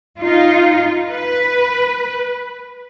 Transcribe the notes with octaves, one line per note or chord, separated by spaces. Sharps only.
D#4 F4
B4